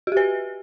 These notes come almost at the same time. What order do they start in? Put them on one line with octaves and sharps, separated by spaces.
F#4 G4 B4